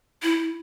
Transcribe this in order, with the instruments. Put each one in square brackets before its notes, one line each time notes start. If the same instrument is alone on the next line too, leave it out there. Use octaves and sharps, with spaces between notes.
[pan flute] E4